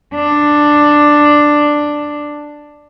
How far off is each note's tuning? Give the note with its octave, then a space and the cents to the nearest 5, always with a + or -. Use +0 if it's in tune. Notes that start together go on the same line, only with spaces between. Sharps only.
D4 +5